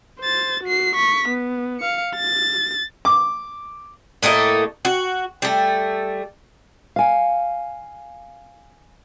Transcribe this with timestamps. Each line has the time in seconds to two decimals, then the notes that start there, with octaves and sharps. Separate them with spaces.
0.20 C5 A6
0.64 F#4 C7
0.95 C#6 B6
1.28 B3
1.80 F5 C#7
2.16 A6
3.05 D6
4.23 A2 A3 A#3 D#5
4.85 F#4
5.42 G3 A3
6.96 F5 G#5